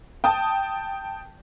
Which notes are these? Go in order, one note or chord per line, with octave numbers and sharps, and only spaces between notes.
G5 A5 D#6